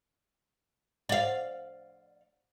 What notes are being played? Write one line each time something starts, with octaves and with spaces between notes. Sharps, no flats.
D5 F5